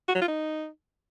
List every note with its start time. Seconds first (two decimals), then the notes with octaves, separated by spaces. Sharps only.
0.08 F#4
0.15 F#3
0.21 F4
0.28 D#4